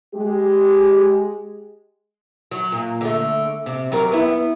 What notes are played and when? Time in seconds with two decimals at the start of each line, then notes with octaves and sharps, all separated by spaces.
0.14 G#3 G4
2.51 F#3
2.72 A#2
3.01 D3 A3
3.66 C3
3.92 F#3 G3 A#4
4.11 B3 E4